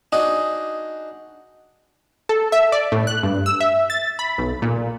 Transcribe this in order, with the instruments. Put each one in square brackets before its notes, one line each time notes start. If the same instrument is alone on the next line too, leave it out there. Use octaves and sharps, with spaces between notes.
[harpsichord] D4 D#4 F#4 G#4 D5 D#5
[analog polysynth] A4
E5
D5
A2
F#6
G2
E6
E5
A6
B5
B1
A#2